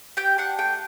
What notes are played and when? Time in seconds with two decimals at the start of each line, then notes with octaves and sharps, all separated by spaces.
0.17 G4 G5
0.38 D4 F#5
0.58 A3 G5